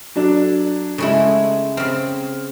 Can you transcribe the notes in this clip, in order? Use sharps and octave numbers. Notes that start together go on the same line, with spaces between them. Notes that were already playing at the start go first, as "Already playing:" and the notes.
F#3 D4 A4
C#3 G#3 A3 C#4 E4
C#3 C4 F6